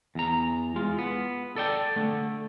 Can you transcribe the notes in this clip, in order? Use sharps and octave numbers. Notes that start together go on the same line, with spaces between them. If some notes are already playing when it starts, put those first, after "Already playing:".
E2 A#5
G#3 F4
B3
A4 D5 G5
D3 A3